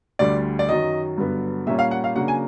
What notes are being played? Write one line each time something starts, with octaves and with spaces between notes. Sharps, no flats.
D2 D3 G3 D5
D5
F#2 D#3 F#3 D#5
G2 D3 F#3 B3
A#2 G3 A#3 C#4 E5
F5
F#5
F5
C#3 F#3 A#3 D4 F#5
G#5